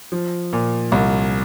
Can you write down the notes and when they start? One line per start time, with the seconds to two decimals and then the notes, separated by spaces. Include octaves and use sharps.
0.12 F3
0.53 A#2
0.92 C2